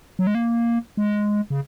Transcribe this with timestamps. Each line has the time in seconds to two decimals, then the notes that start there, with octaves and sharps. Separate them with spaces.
0.19 F#3
0.27 G#3
0.35 A#3
0.97 G#3
1.50 C#3